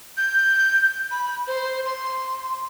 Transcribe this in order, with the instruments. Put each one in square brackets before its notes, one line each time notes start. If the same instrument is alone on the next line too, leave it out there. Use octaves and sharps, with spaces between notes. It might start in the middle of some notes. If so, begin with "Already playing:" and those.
[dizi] G6
B5
C5
C6